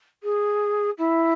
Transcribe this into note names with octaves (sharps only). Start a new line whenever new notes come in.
G#4
E4